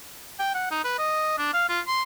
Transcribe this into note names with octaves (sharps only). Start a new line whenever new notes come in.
G5
F#5
D#4
B4
D#5
D4
F5
F4
C6